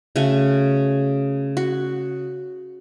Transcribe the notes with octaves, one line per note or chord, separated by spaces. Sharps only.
C#3 A3 F#4 G#5
F#4